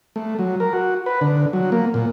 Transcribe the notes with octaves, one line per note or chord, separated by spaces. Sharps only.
A3
F#3
A#4
F#4
B4
D3
F#3
A#3
A#2